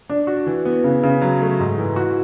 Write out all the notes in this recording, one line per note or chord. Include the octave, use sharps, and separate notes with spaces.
D4
F#4
E3
B3
C#3
C#3
F#3
A3
G#2
E3
F#4